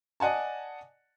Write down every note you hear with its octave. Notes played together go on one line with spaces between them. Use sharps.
D5 D#5 F#5 G#5 A5